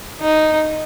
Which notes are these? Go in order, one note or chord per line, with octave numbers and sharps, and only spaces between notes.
D#4